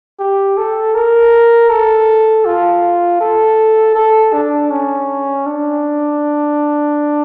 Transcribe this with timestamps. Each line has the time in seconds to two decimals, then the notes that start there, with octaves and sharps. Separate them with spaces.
0.20 G4
0.57 A4
0.95 A#4
1.69 A4
2.45 F4
3.21 A4
3.95 A4
4.33 D4
4.71 C#4
5.46 D4